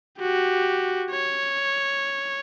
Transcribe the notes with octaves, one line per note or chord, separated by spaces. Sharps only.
F#4 G4
C#5